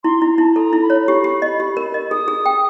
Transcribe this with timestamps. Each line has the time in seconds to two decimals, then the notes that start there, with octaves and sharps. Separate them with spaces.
0.04 E4 C6
0.22 E4 A#5
0.38 E4 A5
0.56 A4 A#5
0.73 E4
0.82 B5
0.90 C#5
1.07 G4 B5
1.24 G4
1.42 D#5
1.60 G4
1.77 A#4
1.94 D#5
2.11 G#4 D#6
2.28 G#4
2.46 G5